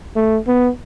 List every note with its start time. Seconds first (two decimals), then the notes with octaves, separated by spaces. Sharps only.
0.16 A3
0.47 B3